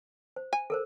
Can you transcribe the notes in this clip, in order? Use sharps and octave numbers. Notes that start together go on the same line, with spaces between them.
C5
G#5
A4 A#4 C5